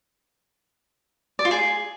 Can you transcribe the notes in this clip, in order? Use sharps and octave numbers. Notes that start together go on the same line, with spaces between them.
D5
F4
G#4